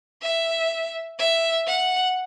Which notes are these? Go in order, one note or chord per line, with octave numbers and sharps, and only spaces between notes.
E5
E5
F#5